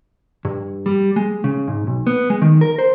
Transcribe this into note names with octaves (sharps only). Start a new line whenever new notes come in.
G2
G3
G#3
C#3
G#2
B1
B3
G#3
D#3
A#4
C5